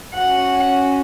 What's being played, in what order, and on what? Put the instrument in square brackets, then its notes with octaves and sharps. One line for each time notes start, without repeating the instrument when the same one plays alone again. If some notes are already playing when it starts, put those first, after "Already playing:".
[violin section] C#4 F#4 F#5